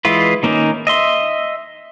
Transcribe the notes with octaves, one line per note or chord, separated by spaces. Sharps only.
E3 G#3 E4 F4 B4
D#3 A#3 C#4 D#4
D#5 E5 C6